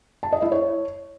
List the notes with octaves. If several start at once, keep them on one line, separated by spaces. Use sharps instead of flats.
A5
D#5
E4
C#5